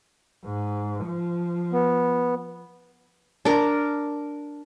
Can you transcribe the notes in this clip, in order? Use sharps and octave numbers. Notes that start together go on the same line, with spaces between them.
G#2
F3
B3
D4 A#4